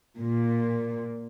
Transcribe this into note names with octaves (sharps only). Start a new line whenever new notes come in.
A#2